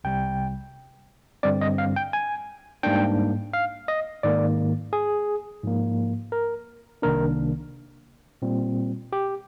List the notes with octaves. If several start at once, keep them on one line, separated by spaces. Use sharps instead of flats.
C2 C3 G3 G5
G2 D3 G3 C4 D5
D#5
F5
G5
G#5
G#2 G3 A#3 D4 G5
F5
D#5
G#2 D#3 A#3 D5
G#4
G#2 F3 A#3
A#4
C2 C3 D#3 A#3 D4 A#4
A#2 G3 C4
G4